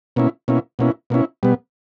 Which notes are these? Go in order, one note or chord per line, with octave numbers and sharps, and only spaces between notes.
B2 A#3 C#4 E4
B2 A#3 C#4 E4
B2 A#3 C#4 E4
B2 A#3 C#4 E4
B2 G3 B3